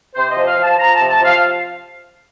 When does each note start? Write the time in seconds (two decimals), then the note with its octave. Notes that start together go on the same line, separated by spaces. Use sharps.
0.14 C3 C5
0.30 D#5
0.36 F3
0.47 F5
0.57 F3
0.62 A5
0.78 F3 A#5
0.94 A5
0.99 C3
1.09 A5
1.20 F3
1.25 F5